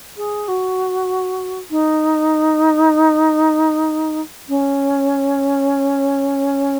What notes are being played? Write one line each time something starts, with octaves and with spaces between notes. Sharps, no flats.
G#4
F#4
D#4
C#4